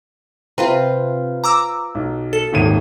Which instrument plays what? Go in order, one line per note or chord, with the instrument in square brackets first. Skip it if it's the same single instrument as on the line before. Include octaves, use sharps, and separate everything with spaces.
[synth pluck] C3 [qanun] F4 B4 C5
[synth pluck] A#5 D6 E6
[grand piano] B1
[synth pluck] A4
[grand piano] D#1 G#1 D#7